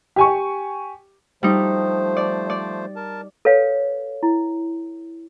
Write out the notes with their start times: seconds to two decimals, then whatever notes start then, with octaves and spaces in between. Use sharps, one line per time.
0.16 G4 G#5 C#6
1.43 F3 G3 A3 D#4 C5
2.17 D5
2.50 D5
2.96 A#4 A5
3.45 A4 B4 C#5 F5
4.23 E4